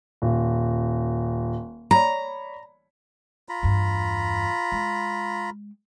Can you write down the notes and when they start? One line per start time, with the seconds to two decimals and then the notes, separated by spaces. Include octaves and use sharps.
0.22 D#1
1.91 C#5 D5 A#5 B5
3.49 F4 A#5 B5
3.63 E2 G2
4.72 G#3